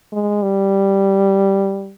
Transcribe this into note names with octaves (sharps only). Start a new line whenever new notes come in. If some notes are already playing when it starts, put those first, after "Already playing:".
G#3
G3